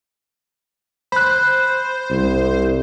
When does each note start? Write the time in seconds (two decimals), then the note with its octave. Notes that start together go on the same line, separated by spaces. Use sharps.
1.12 C5 B5 F#6
2.11 C2